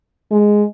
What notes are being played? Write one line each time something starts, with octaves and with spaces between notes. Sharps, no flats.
G#3